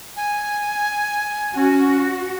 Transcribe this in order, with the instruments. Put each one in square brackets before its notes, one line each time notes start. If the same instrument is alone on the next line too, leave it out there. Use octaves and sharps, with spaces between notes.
[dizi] G#5
[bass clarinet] C#4 [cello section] F#4